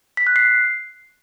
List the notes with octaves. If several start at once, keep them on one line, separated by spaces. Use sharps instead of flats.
B6
F#6
C7